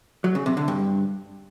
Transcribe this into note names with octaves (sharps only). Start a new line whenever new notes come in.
F#3
C#3
C3
D3
G2